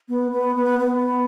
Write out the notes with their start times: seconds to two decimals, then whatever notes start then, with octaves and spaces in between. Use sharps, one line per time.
0.09 B3
0.32 B3
0.56 B3
0.79 B3